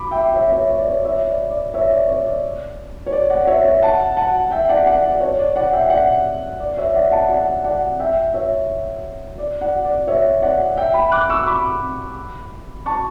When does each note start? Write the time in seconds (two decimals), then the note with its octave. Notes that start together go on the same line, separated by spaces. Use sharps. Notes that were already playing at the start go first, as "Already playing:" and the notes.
Already playing: B5 D6
0.11 E5 G5
0.34 C#5 E5
0.52 C#5 E5
0.69 C#5
0.79 D5
0.86 C#5
1.04 C#5 E5
1.27 D5
1.50 D5
1.74 C#5 E5
1.90 D5
2.08 C#5
2.26 D5
3.06 C#5
3.12 D5
3.30 D5 F#5
3.47 C#5 E5
3.65 C#5 E5
3.82 F#5 A5
4.17 F#5 A5
4.51 E5 G5
4.69 D5 F#5
4.86 D5 F#5
5.04 D5
5.20 C#5
5.39 D5
5.56 D5 F#5
5.73 E5 G5
5.90 D5 F#5
6.60 D5
6.77 C#5 E5
6.90 E5
6.95 D5 F#5
7.12 F#5 A5
7.29 D5 F#5
7.64 D5 F#5
8.00 E5 G5
8.34 C#5 E5
9.38 D5
9.61 D5 F#5
9.85 D5
10.07 C#5 E5
10.42 D5 F#5
10.76 E5 G5
10.94 G5 B5
11.12 D6 F#6
11.29 C#6 E6
11.47 B5 D6
12.86 A5 C#6